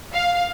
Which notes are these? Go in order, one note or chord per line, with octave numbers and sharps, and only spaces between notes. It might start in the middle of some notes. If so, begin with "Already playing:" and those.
F5